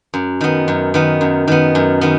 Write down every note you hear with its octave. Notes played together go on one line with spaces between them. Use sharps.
F#2
D#3 B3
F#2
D#3 B3
F#2
D#3 B3
F#2
D#3 B3